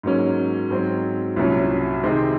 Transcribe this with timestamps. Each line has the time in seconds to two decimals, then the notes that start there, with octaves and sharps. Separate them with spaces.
0.03 G#2 F#3 A#3 C#4
0.70 G#2 F#3 C4
1.36 C2 A#2 F#3 C#4
2.03 C3 D#3 G#3 C4